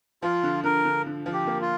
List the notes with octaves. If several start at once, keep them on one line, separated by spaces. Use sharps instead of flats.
F3 F4
D3
D3 A#4
D3
D3
F3
G4
A#3
F4